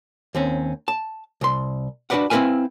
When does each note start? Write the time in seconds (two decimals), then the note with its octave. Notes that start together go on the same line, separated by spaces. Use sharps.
0.35 D#2 C4 C#4
0.88 A5
1.41 C2 C6
2.10 D4 F#4 A4 B4 D5 F#5
2.30 C4 E4 A#4 B4 F5 G#5